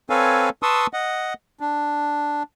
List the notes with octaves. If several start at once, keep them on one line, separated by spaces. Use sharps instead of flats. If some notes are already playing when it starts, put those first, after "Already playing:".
C4 A4 B4 C#5 F5 G#5
B4 A5 C6 C#6 D#6 E6
D#5 F#5
D4